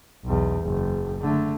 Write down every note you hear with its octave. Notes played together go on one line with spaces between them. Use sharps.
B1 E2
F#1
D3 A3